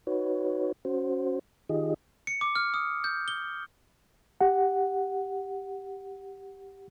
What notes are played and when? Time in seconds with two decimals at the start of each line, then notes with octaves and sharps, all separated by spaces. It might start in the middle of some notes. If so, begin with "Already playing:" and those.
0.07 D#4 F#4 B4 C#5
0.85 C#4 F#4 C5
1.69 D#3 D#4 F4 G4 G#4 D#5
2.27 C#7
2.41 D6
2.55 F6
2.74 D#6
3.04 G6
3.28 G7
4.41 G4 F#5